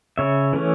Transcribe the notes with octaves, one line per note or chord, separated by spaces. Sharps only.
C#3 C#5 E5
E3 A3 C#4